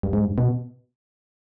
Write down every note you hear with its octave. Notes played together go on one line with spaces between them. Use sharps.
G2
G#2
G2
B2